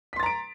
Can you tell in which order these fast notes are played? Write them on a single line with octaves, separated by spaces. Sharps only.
B6 C6 A6 A#5 D7